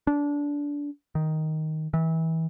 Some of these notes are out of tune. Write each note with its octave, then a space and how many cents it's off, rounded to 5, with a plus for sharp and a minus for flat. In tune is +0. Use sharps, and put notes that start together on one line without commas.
D4 -20
D#3 +5
E3 -30